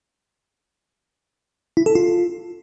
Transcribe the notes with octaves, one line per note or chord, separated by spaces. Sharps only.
E4
A4
F4